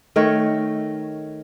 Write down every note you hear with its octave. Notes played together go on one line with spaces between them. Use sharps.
D#3 A3 A#4 C#5